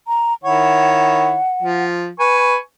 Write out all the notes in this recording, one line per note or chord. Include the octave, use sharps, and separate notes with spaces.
A#5
D#3 E4 C#5 F#5
F3
B4 G#5 C#6